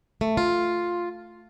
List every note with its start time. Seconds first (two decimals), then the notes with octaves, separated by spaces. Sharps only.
0.21 A3
0.37 F4